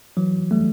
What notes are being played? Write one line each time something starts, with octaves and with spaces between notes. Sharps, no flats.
E3 F#3
G3 A3